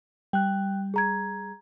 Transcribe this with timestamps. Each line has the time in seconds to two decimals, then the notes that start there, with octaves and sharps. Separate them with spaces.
0.33 G3 G5 F#6
0.94 G#4 A#5 G#6